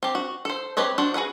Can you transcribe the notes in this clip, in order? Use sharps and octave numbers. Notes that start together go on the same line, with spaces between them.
C4 G4
F#4
A4 C5
C4 G4 B4 C#5 D#5
D4 F#4 C5
F#4 G#4 B4 F#5